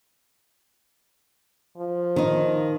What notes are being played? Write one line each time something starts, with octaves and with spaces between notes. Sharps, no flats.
F3
D#3 D#4